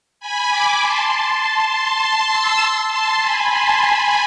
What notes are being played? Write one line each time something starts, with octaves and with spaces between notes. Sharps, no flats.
G#5 B5
B5 D6
A5 C6
A5 C6
A5 C6
C6 E6
A5 C6
G#5 B5
A5 C6
G#5 B5